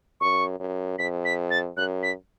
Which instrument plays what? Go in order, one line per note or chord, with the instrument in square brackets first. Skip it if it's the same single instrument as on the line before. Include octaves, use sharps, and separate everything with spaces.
[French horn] F#2 [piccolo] C#6
[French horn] F#2
[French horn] F2 [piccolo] B6
[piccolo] B6
A6
[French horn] F#2 [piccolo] F#6
[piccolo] B6